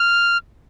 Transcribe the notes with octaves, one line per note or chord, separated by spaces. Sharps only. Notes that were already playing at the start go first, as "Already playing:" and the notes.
Already playing: F6